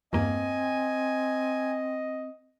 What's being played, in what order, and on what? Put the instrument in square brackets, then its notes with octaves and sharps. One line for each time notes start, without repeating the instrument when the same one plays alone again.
[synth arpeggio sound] E2 G2 A#3 [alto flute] C4 [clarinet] D#5 [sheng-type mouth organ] G#5